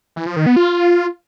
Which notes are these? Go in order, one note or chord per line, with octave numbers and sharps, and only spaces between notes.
E3
F3
D#3
B3
F4